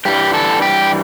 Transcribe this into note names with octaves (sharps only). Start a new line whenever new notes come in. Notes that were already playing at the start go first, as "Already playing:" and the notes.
G2 E3 G3 G4
A4
G4